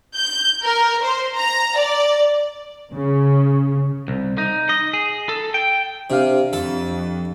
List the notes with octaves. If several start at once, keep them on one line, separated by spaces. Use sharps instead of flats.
G6
A#4
C5
A#5
D5
C#3
C2
D#4
D#5
G#4
A4
G5
C3 D4 G4 F5
F2 A4